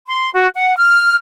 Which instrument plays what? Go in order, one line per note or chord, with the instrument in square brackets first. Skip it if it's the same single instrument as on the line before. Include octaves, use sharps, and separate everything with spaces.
[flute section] C6
F#4
F#5
F6